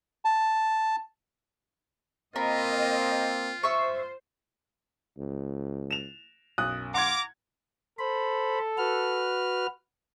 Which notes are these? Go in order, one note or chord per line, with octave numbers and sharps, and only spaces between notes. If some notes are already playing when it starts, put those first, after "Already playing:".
A5
A#3 C4 F4 A#4 D#5 B5
C5 E5 C#6
C#2
E7 F7
B1 F#2 D#6 F#6
F5 F#5 A#5 C6 D6 G#6
A4 C5 B5
F#4 B4 F6